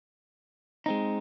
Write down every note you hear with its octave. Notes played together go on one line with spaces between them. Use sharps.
G#3 C4 D#4